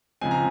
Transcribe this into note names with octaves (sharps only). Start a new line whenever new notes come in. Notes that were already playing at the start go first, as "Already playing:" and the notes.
C#3 F3 G#3 C4 G#5
A#5